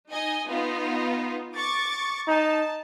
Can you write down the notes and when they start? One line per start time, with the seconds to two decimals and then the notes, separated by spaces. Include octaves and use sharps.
0.12 D#4 D#5 G#5
0.48 B3 D#4 F4
1.54 C#6 D6 A6
2.27 D#4 A5